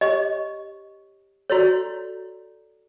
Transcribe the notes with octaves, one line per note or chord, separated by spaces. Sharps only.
G4 C#5 D#5 C#6
F#4 A4 C#5 D5 A#5